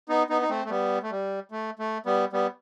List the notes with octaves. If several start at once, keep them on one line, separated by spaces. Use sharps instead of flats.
B3 D#4
B3 D#4
D#4
A3 C4
A3
G3 B3
A3
G3
A3
A3
G3 B3
G3 B3